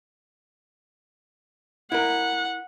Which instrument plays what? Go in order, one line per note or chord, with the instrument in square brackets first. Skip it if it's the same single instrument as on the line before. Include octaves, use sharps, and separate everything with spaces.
[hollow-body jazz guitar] E4 A#4 [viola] F#5